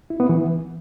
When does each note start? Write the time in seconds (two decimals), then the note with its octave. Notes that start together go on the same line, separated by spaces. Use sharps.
0.10 E4
0.20 B3
0.29 E3